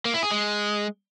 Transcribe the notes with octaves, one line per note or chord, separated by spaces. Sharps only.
A#3
E4
G#4
G#3